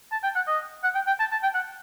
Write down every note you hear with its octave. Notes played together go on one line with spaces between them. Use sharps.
A5
G5
F#5
D#5
F#5
G5
G5
A5
A5
G5
F#5